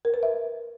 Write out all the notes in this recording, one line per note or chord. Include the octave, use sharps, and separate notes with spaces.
A#4
B4
E5